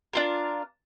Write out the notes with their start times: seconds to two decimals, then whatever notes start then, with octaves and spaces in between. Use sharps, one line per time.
0.13 D4 F4 A#4